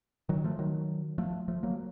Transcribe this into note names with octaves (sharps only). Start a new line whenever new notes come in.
D#3 F#3
F3 A3
D#3 F#3
F3 A3
F3 A3
F#3 A#3